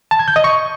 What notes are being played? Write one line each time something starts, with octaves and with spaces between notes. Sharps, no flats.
A5
G#6
G6
D#5
C#6